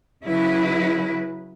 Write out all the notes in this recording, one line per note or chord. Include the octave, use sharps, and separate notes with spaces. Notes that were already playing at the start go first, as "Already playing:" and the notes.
C#3 F#3 E4 B4